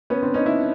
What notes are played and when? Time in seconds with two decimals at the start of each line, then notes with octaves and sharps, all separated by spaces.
0.10 B3 C#4
0.22 C4 D4
0.34 C#4 D#4
0.46 D4 E4